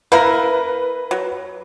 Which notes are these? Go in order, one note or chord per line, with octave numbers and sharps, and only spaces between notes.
A#3 E4 A#4 B4
F#3